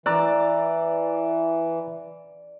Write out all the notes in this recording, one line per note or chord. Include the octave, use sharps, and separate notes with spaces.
E3 D5 A#5 E6 F#6